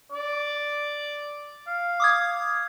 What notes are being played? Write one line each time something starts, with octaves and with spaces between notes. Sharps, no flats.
D5
F5
D6 D#6 G#6